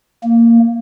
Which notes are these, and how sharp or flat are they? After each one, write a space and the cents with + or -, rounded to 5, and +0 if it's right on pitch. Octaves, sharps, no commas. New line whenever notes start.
A#3 -10